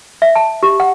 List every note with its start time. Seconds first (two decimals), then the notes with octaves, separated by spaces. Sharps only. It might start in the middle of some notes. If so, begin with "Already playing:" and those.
0.22 E5
0.35 A5
0.63 G4
0.80 F#5